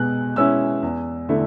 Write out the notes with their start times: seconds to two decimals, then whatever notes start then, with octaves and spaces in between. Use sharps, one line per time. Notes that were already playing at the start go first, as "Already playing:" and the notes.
Already playing: B2 G#3 F#6
0.36 G#3 C#4 E4 E6
0.83 E2
1.29 D3 A3 E4